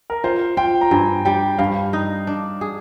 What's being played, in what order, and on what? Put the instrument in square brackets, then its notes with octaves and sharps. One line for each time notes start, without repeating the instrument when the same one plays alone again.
[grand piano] A#4
[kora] F4 [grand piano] C5
[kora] F4 [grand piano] G5
[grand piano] A#5
[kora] G2 [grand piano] G#5
[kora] G3 [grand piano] G5
[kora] G2 [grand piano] F5
[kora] D#4
D4
G#4